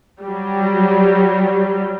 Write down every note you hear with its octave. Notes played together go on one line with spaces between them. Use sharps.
F#3 G3